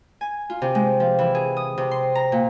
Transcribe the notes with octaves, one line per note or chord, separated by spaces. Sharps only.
G#5
F4
C3
G#3
F3
E3
G#4
D#6
C3
C6
A#5
A#2